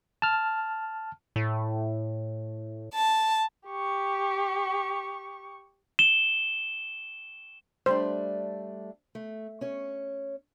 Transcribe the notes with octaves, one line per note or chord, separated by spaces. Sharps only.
A5 F6
A2
A5
G4 C#6
E7 G7
G3 A3 D4 C5
A3
C#4 C#5